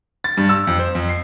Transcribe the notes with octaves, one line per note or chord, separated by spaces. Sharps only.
A6
G2
E6
F2
C5
F2
C7